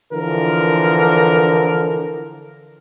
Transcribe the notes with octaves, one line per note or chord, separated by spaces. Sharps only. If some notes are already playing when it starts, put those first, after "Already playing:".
D3 E3 F3 E4 A#4